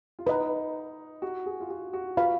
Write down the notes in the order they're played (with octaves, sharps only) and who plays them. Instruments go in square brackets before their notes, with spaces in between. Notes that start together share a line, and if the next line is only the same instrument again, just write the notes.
[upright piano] F4
[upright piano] D#4 [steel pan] B4 D#5 A#5
[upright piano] F#4
G#4
F4
F#4
F#4
[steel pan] F4 B4 F5 B5 [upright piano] F#4